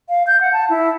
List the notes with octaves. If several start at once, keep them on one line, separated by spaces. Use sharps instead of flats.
F5
G6
F#5
A5
E4